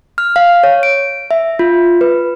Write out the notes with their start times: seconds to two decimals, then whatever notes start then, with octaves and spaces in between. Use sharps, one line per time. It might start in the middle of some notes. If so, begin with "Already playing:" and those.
0.18 F6
0.36 F5
0.63 C#5
0.83 D7
1.31 E5
1.59 F4
2.01 B4